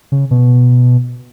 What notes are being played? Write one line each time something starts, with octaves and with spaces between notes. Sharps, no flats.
C#3
B2